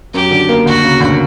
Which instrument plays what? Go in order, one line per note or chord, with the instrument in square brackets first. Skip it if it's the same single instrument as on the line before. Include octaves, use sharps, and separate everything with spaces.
[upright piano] F#2 [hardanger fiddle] G4
[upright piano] D3
A#3
[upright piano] D2 [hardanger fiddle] F#4
[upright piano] C#3
D2